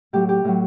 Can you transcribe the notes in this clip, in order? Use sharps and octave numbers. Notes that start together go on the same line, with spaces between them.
A2 F#3 G4
G4
A2 F#3